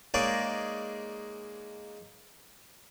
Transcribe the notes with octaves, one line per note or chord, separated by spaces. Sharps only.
G#3 A#3 D#4 G#4 C#5 D5